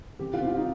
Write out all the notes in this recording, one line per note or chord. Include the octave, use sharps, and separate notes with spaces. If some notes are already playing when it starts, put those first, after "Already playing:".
C3 G4
F4
C4
F4
D#4